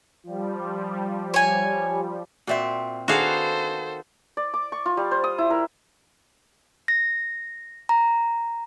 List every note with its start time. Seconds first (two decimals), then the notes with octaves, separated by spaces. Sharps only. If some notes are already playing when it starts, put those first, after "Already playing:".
0.23 F3 G3
1.34 C#5 G#5
2.47 A#2 C4 F#4 C5 D5 E5
3.08 D#3 B3 D4 F#4 G#4 A4 C5 F5
4.37 D5
4.54 D6
4.72 C#6
4.86 F4
4.97 G3
5.11 C5
5.24 D#6
5.38 E4
5.50 A#4
6.88 A#6
7.89 A#5